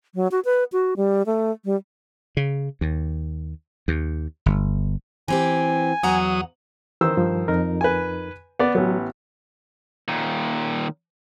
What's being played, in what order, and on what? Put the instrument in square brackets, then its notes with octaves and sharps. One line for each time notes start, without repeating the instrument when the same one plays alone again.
[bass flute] F#3
F#4
B4
F#4
G3
A3
G3
[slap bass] C#3
D#2
D#2
G1
[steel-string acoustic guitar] E3 C4 G4 [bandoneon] G#5
[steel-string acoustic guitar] E2 F#5 A#5 [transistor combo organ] F#3 D#6
[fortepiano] D#3 C5 E6 [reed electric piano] E3
[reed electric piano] G2 F3
F2 D#4 A#4
[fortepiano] B4 G#5
B3 D5
[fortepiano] A1 B3 [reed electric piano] F#3
[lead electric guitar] A#2 D#3